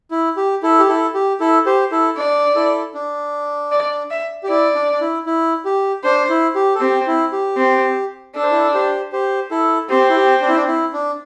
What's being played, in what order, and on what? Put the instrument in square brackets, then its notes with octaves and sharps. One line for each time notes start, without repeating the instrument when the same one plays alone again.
[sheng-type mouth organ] E4
G4
E4 A4
G4
E4 A4
G4
E4 A4
G4 C5
E4 A4
[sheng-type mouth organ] D4 [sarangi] D5
[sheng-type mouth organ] E4 A4
D4
[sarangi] D5
E5
[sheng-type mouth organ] G4
[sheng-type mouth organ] E4 [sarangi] D5
[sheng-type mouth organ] D4
D4
E4
E4
G4
[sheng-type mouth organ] D4 [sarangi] C5
[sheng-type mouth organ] E4
G4
A4
[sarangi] C4 [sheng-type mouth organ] G4
[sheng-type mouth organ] E4
G4
[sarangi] C4
[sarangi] D4 [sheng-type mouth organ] A4
[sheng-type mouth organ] C5
E4 A4
G4 C5
G4 C5
E4 A4
[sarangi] C4 [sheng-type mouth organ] G4 C5
[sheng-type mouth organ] E4
G4
D4
E4
D4
E4
D4